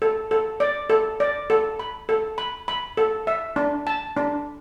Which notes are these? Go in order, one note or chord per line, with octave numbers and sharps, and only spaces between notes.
A4
A4
D5
A4
D5
A4
B5
A4
B5
B5
A4
E5
D4
A5
D4